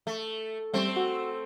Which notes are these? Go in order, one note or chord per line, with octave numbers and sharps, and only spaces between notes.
A3
G3 A3 C4
F#4